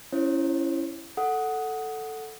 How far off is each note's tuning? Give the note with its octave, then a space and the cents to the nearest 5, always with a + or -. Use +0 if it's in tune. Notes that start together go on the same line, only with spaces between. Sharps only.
C#4 +0 E4 +15 C5 +45
A4 +0 F#5 +0 D#6 +15